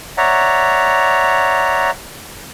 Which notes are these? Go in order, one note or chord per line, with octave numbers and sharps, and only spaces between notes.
C#5 D5 E5 F#5 A#5